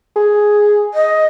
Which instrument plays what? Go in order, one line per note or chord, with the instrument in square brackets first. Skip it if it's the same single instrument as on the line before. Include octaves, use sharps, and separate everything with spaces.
[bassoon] G#4
[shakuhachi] D#5